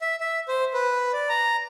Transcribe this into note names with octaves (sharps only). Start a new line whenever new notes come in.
E5
E5
C5
B4
D5
A#5